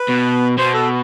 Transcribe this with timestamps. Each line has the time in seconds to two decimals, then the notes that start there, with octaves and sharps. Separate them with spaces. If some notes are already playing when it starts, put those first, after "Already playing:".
Already playing: B4
0.09 B2
0.58 B2 C5
0.74 A4